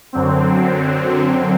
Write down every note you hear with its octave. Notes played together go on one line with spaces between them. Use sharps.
F#2 D3 F#3 C4